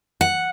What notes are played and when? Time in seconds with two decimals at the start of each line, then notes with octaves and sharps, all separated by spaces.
0.21 F#5